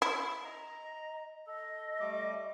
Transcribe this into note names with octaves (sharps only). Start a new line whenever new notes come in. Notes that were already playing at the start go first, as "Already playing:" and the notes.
E4
D#5 A#5
A4 D#5
G3 A3 D6